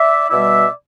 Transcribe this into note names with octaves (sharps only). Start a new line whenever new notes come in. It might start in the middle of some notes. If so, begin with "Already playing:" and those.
Already playing: D5 E5
B2 G3 D5 E5